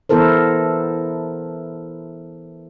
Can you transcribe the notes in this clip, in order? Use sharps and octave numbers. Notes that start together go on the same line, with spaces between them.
E3 B3 E4 A4 A#4 C5